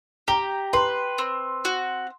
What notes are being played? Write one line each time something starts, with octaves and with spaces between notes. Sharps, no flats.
G4 A#5
B4 C6
C4
F#4